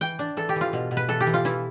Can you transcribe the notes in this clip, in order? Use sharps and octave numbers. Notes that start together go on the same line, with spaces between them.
E3 G5
D4
E3 A4
G4
E3
F4
B2
B2
B4
E3 A4
G4
E3
F4
E3 E4